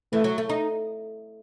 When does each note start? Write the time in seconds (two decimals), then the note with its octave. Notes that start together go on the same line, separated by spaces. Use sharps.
0.13 E3 A3
0.24 F#3
0.38 A3
0.49 D#4